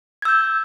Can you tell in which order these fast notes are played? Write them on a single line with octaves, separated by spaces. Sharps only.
G#6 E6 G6